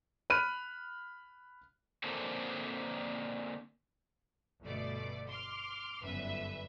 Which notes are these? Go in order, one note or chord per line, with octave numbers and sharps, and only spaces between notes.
B5 F6 F#6 D#7
D3 A#3 C4 G#4 A4 C5
G1 B2 A3 D5
C6 D6 F6
G1 F#2 B4 E5